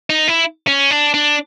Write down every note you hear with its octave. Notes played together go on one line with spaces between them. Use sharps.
D#4
E4
C#4
D4
D4